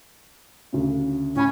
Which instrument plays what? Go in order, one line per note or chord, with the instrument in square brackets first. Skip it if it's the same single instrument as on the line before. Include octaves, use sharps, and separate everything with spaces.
[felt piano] D2 C#3
[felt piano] A2 G#5 B5 [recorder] C#4